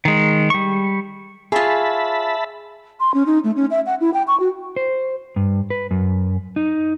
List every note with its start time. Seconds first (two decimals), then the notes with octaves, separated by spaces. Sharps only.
0.05 D#3 G#3
0.50 G3 C#6
1.52 F4 G#4 C#5 E5 A5 B5
3.00 C6
3.14 C#4
3.26 D#4
3.44 A3
3.56 C#4
3.71 E5
3.86 F#5
4.01 E4
4.14 G5
4.27 C#6
4.40 F#4
4.76 C5
5.36 G2
5.70 B4
5.91 F#2
6.56 D#4